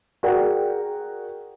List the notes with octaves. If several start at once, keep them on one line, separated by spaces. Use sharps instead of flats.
F#4 G#4 A#4 D5 G5